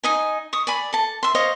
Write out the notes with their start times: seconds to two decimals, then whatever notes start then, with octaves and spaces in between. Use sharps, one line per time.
0.03 D#4 D#5 G#5
0.53 C#6 D#6
0.67 D5 G#5 B5
0.93 A4 A5
1.23 E5 C6
1.35 C5 C#5 D#5 F5